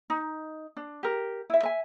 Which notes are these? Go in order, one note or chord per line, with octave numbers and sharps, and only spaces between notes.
D#4
D4
G4 A#4
E4 E5
E5 G#5